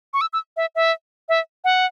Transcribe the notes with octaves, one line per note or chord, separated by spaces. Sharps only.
C#6
E6
E6
E5
E5
E5
F#5